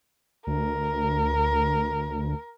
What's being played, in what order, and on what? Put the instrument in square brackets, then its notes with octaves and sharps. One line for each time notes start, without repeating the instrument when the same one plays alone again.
[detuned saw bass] D2 [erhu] A#4